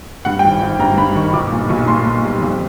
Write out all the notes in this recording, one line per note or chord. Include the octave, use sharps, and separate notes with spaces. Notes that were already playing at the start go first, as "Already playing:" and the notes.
G2 F#5
G5
G#1
G#1
G2 A#5
G2 B5
D#3 C#6
B1 D6
A#2
B1 C#6
A#2 C6
A#2
G3
F2